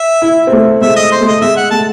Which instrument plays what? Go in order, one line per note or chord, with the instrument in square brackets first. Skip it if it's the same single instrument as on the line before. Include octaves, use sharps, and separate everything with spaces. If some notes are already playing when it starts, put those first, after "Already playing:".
Already playing: [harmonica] E5
[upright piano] E4
C4
A3
[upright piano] G#3 [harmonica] E5
[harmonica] D#5
C5
[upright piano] A3
[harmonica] D#5
[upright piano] G#3 [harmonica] E5
[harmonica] F#5
[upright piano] A3 [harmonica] A5